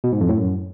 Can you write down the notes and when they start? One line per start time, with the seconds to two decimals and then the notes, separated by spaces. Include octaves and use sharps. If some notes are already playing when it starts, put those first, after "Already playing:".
0.04 B2
0.12 G#2
0.21 F2
0.29 A2
0.37 F#2